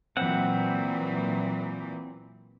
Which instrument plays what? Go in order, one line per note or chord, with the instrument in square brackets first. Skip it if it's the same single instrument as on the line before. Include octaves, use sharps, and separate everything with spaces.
[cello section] A#2 E3 F#3 [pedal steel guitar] C4 F#5